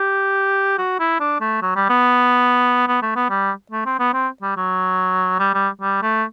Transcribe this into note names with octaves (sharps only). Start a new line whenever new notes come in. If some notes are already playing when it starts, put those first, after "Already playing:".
Already playing: G4
F#4
E4
D4
A3
F#3
G3
B3
B3
A3
B3
G3
A3
C4
B3
C4
G3
F#3
G3
G3
G3
A3